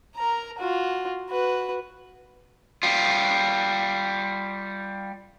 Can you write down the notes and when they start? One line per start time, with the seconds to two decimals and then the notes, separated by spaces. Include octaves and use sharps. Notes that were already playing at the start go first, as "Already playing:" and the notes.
0.16 A#4 A#5
0.59 F4 F#4
1.30 F#4 B4
2.83 G3 F4